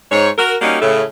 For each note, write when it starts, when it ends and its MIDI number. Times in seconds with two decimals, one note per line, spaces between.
0.12 0.29 44
0.12 0.29 73
0.38 0.55 66
0.38 0.55 70
0.62 0.76 55
0.62 0.76 58
0.62 0.76 61
0.62 0.76 63
0.62 0.76 66
0.62 0.76 67
0.81 1.03 45
0.81 1.03 49
0.81 1.03 57